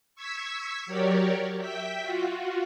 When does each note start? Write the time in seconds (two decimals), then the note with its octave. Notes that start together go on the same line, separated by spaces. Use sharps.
0.15 C#6 E6 G#6 B6
0.86 F#3 G4 A#4 C#5 D5
1.59 E5 G5 B6
2.02 F4 F#4